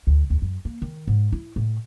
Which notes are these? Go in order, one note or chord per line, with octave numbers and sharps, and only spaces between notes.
D2
D#2
F#2
A#3
D#3
G#2
E4
A2